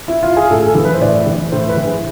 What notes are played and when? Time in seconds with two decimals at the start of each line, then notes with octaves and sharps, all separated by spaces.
0.08 E4
0.23 F4
0.37 G#4
0.51 A2 A4
0.67 A4
0.75 E3
0.85 B4
0.94 C5
1.00 A2 D5
1.26 E3
1.52 A2 C5
1.69 B4
1.77 E3
1.86 G#4